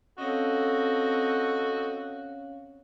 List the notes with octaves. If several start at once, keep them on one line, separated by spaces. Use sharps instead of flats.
C4 C#4 F#4 A4 C#5 D#5 F5